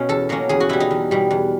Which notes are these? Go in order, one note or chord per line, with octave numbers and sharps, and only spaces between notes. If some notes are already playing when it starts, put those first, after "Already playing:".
Already playing: B2 C#4
E2 A4
B2 F#3 A#3 C#4
E2 G#4
F#4
B2 G3 E4
D#4
E2
B2 G3
E2